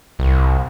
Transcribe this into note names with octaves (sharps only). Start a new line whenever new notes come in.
C2